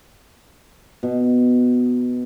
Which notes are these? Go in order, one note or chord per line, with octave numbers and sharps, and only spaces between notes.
B2